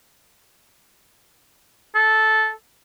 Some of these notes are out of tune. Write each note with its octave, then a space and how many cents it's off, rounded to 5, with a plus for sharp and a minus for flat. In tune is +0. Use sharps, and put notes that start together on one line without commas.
A4 -10